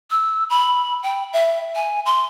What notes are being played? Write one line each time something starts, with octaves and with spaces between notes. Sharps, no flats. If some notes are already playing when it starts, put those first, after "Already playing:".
E6
B5
G5
E5
G#5
C6